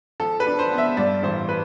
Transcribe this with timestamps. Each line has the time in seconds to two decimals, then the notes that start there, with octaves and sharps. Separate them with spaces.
0.20 F3 A4
0.40 B4
0.46 D4
0.59 C5
0.71 B3
0.78 E5
0.97 G2 D5
1.23 A1 C5
1.49 B4